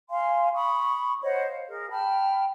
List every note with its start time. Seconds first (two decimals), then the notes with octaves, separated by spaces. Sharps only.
0.10 F5 G#5 C6
0.54 B5 C#6 D#6
1.23 C5 C#5 D#5 F#5
1.48 F5
1.68 G#4 A#4
1.91 G5 A5 B5 F6